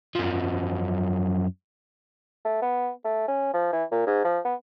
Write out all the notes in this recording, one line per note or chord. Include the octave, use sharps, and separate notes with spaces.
F#2 F3
A3
B3
A3
C#4
F3
E3
A#2
G#2
F3
B3